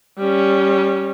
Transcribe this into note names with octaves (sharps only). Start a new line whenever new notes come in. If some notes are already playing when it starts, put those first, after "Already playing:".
G3 C#4